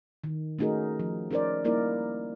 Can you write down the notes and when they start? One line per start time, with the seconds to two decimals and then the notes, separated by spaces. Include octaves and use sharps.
0.24 D#3
0.59 A3 C#4 D#4 F#4 G#4 A#4
1.00 F3
1.31 C#4 D#4 A#4 C5 D5
1.64 G3 A#3 D#4 E4 A#4 D5